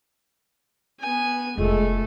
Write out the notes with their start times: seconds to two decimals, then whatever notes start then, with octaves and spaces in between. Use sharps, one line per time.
1.00 B3 G#5
1.57 F1 G#3 A3 F4 A4